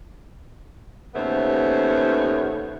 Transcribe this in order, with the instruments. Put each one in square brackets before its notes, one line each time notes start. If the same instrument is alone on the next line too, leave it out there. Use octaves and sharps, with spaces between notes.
[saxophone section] D#2 C#3 A3 B3 C5 C#5